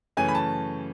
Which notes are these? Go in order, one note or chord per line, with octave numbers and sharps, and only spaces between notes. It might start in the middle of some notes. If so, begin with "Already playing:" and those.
F#2 C#3 E3 A3 C#4 G#5
B5
A5